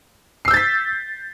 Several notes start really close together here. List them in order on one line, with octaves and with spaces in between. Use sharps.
C7 E6 G6 A6 B6